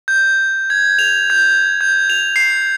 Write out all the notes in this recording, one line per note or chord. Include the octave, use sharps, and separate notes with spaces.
G6
G#6
F7
G6
G6
F7
C7